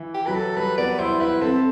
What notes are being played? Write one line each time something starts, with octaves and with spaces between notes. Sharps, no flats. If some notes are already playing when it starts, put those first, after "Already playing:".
Already playing: E3
G4
F#3 B4
A4
G3 B4
B3 D5
E4 C5
E4 B4
C4 A4